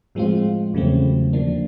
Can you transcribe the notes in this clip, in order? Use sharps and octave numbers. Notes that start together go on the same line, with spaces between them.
A2 F3 G#3 C4 F4
E2 C#3 F#3 A3 C4
D3 F3 A#3 D4